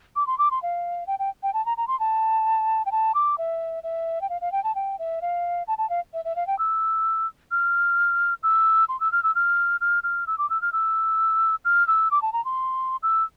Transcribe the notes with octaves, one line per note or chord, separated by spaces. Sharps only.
D6
C6
D6
C6
F5
G5
G5
G5
A5
A#5
A#5
C6
A5
G5
A5
D6
E5
E5
G5
F5
F5
G5
A5
G5
E5
F5
A5
A5
F5
E5
E5
F5
G5
E6
F6
E6
C6
E6
F6
E6
F6
F6
F6
E6
D6
E6
F6
E6
F6
E6
D6
A5
A#5
C6
E6